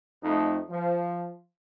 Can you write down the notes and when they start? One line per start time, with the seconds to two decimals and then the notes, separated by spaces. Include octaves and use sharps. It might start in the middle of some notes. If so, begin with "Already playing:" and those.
0.23 F2 A3 D#4
0.69 F3